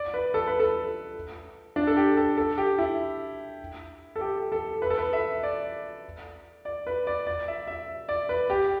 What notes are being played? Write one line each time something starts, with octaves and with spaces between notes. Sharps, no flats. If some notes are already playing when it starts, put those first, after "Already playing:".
Already playing: D5
B4
A4
B4
A4
D4
A4
G4
A4
A4
G4
E4
A4
G4
A4
B4
A4
B4
E5
D5
D5
B4
D5
D5
E5
E5
D5
B4
G4